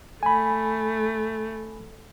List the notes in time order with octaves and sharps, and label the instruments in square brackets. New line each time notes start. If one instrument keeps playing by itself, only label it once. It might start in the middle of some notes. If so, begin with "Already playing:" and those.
[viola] A3 [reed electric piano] G#5 B5